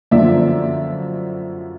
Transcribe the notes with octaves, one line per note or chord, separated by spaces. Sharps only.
F#2 D3 F3 D5 E5